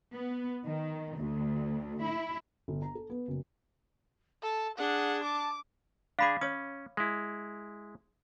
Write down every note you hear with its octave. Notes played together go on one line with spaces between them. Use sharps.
B3
D#3
D2
E4
G1
A#5
A4
B3
F#1
A4 A5
D4 G#4 F#5
A5 D6
D4 G#4 F5 B5 D6
C#4 C#5 D#6
G#3 E4